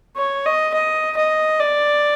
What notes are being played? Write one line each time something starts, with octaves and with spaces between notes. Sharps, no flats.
C#5
D#5
D#5
D#5
D5